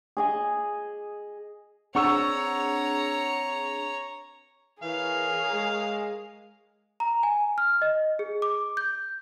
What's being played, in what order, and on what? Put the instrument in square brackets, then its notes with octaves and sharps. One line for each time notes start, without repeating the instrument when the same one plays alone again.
[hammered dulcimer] G#4 D#5 G#5
[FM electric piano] C4 D4 G#4 [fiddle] C#5 A#5 [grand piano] F#5 C#6 E6
[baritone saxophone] E3 [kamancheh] G#4 [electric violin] A#4 C#5 [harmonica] F5
[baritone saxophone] G#3
[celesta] A#5
G#5
F6
D#5
G#4
D6
G6